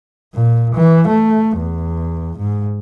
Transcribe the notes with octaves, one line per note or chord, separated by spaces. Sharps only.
A#2
E3
A3
E2
G#2